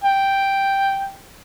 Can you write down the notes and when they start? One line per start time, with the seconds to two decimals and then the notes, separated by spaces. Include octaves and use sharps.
0.04 G5